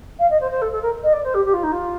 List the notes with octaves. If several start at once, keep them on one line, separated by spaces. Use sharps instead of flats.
F5
D#5
C5
C5
A4
A4
A#4
D#5
D5
C5
G4
G4
F4
D#4
F4